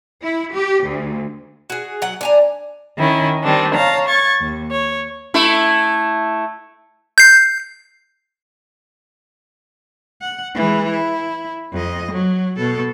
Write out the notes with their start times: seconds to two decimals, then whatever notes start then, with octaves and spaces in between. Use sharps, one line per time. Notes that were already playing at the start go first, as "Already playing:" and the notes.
0.23 E4
0.53 G4
0.85 D2
1.70 F#4 G#4
2.02 F#3 F#5
2.21 D4 G#5 A#5
2.98 D#3 C#4 E4
3.43 D#3 G3 C4 D4
3.74 C#5 F5 A5 A#5
4.08 C#6 G#6 A6
4.40 D#2
4.71 C#5
5.34 A3 E4
7.18 G6 C7
10.21 F#5
10.55 E3 G#3
10.90 E4
11.72 F2 D#5
12.12 F#3
12.56 B2 A4